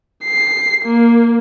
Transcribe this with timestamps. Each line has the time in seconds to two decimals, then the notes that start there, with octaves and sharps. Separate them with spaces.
0.25 C7
0.85 A#3